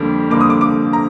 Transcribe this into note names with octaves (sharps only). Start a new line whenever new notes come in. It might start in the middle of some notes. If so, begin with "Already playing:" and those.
Already playing: F2 D3 G3 A#3
F2 D3 G3 A#3 D6
D#6
D6
D6
A#5